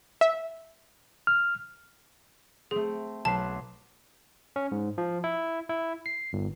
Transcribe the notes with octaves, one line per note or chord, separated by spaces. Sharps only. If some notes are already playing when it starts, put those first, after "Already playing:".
E5
F6
A3 C4 G#4
B1 B4 A5 C7
C#4
G#2
F3
E4
E4
C7
G1